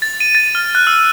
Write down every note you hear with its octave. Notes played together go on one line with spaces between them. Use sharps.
A6
D#7
A6
F6
F#6
E6